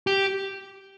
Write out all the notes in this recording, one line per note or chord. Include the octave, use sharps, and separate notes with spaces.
G4